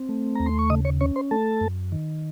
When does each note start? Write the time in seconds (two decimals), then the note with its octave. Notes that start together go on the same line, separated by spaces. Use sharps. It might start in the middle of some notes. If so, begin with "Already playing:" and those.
Already playing: C4
0.09 A3
0.35 D#2 A#5
0.46 C6
0.59 C#6
0.70 C#3 D#5 D#6
0.85 C#5 C#6
1.01 C#4 C#5 C#6
1.16 C5 C6
1.31 A3 A4 A5
1.61 F#2
1.92 D#3